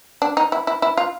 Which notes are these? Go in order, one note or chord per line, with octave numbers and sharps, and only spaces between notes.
D4
D#4
E4
E4
E4
F4